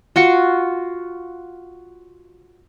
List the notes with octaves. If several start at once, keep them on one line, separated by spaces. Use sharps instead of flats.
F4 F#4 C#6